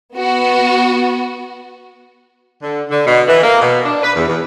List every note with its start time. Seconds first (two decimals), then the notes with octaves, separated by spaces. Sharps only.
0.15 B3 F#4
2.63 D3
2.90 D3
3.06 B2
3.28 E3
3.43 A#3
3.61 B2
3.84 D4
4.03 B4
4.16 E2
4.28 E2